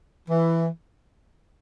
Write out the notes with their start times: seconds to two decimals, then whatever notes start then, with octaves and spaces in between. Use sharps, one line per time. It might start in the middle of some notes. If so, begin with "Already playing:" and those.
0.29 E3